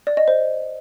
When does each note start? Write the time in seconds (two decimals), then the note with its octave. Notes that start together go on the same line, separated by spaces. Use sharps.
0.07 D5
0.17 D#5
0.28 C5